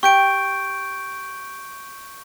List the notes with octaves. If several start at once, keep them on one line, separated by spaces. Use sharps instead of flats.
G4 C#6 G6 D7